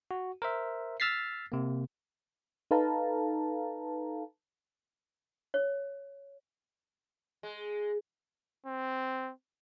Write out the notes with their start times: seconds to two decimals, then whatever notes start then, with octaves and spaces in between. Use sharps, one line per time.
0.11 F#4
0.42 A#4 C5 E5
1.00 E6 F6 A6 B6 C7
1.52 C3 A#3
2.71 D#4 A4 B4 F5 A5 A#5
5.54 C#5
7.43 G#3
8.66 C4